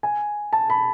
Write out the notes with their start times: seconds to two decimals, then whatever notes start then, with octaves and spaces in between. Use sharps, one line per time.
0.03 G#5
0.53 A5
0.70 B5